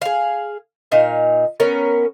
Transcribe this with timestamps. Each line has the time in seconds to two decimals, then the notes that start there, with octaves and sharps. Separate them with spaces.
0.02 G#4 F5
0.92 A#2 D#4 F5
1.60 B3 C#4 A#4